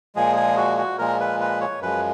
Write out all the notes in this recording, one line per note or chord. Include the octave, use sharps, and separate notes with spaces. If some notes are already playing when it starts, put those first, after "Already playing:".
A#2 F3 G#3 G#4
G#4
F#4
F#4
A#2 F3 G#3 A#4
B4
B4
C#5
F#2 F3 G#3 B4